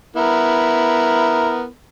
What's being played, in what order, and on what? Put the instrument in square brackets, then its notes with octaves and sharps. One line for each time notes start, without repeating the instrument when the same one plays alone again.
[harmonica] B3 E4 A#4